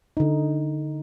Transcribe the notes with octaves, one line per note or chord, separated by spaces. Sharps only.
D3 D#4